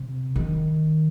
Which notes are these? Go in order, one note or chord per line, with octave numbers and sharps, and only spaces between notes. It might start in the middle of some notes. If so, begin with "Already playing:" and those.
Already playing: C3
D#3